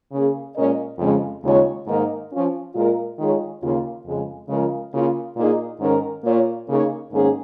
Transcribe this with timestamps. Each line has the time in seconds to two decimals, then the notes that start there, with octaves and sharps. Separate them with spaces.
0.12 C#3 A#3 C#4 G#4
0.55 A#2 G#3 C#4 A#4 D#5
0.99 F2 C#3 G#3 C#4
1.44 D#2 C#3 G#3 F4 C#5
1.86 G#2 D#3 A#3 D#4 A#4
2.30 F3 C#4 F4
2.75 A#2 G#3 F4 A#4
3.18 D#3 G#3 F4 G#4 C#5
3.62 D#2 C#3 A#3 F4
4.06 F2 C#3 G#3
4.49 C#3 F3 G#3 F4 A#4
4.94 C#3 A#3 F4
5.36 A#2 A#3 D#4 G#4
5.81 G#2 D#3 C#4 A#4
6.24 A#2 A#3 F4 C#5
6.68 C#3 A#3 D#4 G#4 C#5
7.12 G#2 D#3 A#3 C#4 G#4